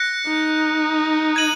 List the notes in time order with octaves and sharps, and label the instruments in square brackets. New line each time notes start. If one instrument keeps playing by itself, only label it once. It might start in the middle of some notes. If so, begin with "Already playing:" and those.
Already playing: [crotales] F#6 A#6 C#7
[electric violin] D#4
[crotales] G#6 D#7 F#7